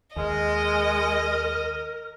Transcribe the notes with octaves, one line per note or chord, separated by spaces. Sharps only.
D#2 G#3 A#4 D#5